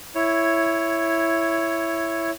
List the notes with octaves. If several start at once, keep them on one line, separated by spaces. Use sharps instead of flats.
E4 C#5